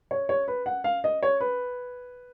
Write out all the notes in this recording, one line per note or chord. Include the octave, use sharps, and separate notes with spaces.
C#5
C#5
B4
F#5
F5
D#5
C#5
B4